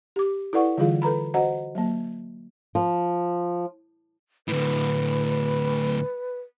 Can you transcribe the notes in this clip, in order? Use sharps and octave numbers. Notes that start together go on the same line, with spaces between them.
G4 D6
E4 A4 B4 D5 F#5 C#6
D3 E3 G3 F4 G#4 F5
A4 B4 A#5 B5
F#4 C5 D#5 F#5 A#5
F#3 A#3
F3
D2 A2 B4